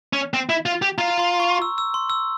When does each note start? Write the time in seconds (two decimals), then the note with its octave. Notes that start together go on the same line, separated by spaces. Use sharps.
0.13 C#4
0.34 C4
0.49 E4
0.66 F4
0.82 G4
0.98 F4 A#5
1.19 C6
1.40 C#6
1.62 E6
1.78 E6
1.94 C6
2.10 E6